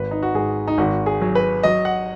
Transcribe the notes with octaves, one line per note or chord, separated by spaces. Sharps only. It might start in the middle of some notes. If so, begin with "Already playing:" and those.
Already playing: G#1 B4
D#4
F#4
G#2 G#4
D#4
G#1 F#4
G#4
F#3
B4
F#3 D#5
F#5